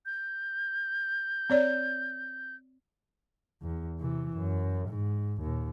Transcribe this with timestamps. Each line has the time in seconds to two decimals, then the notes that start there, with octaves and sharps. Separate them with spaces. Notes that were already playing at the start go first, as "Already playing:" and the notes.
0.06 G6
1.50 C4 C#5 D5
3.62 E2
3.99 C3 E3
4.37 F#2
4.89 G#2
5.42 D#2 A#2